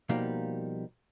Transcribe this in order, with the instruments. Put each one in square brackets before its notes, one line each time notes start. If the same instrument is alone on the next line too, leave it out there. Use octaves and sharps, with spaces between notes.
[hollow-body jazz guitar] B2 F3 G3 A#3 D#4